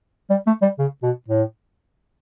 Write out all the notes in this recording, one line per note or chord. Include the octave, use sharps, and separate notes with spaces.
G3
A3
G3
C#3
B2
A2